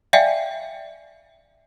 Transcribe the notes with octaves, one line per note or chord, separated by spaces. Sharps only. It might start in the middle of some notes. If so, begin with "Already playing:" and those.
D5 E5 F5 G5 G#5